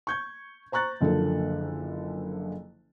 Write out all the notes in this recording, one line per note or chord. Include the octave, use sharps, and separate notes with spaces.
C#6 G6 G#6
C5 A#5 C#6 F#6 A6
F#1 D3 F3 A#3 A4